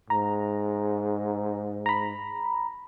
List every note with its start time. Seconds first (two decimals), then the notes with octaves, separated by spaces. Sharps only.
0.10 G#2 A#5
1.86 A#5 B5